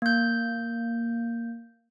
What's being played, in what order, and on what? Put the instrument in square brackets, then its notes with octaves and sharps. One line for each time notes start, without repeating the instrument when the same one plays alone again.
[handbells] A#3 G6